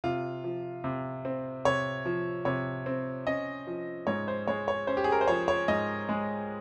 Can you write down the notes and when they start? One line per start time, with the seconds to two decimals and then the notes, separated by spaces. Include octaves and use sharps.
0.04 C3 F4
0.44 F3
0.84 C3
1.25 C4
1.65 C3 C#5
2.05 F3
2.45 C3 C#5
2.86 C4
3.27 C#4 D#5
3.67 F3
4.07 G#2 C#5
4.28 C5
4.47 G#3 C#5
4.68 C#5
4.87 C#4 C5
4.97 G4
5.04 G#4
5.12 A#4
5.21 C5
5.28 F3 C#5
5.48 C#5
5.68 G#2 D#5
6.09 G#3